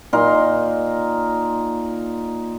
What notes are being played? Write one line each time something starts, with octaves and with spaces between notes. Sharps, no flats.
A#2 D#4 A#4 C6